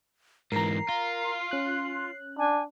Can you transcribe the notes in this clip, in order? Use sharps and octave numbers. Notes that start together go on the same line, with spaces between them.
G#2 E3 A#4 A#5 C7
F4
C#4 F#6
D4 G#5